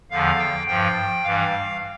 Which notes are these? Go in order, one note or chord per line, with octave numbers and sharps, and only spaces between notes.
E2 D3 F3 F5
G5
G2 F3 G5
G2 E3 G3 F5